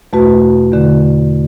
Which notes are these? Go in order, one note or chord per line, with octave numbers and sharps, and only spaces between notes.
E2 B2 A3 F#4 B4
E2 D3 A3